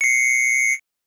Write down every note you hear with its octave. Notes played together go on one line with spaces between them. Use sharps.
C7 C#7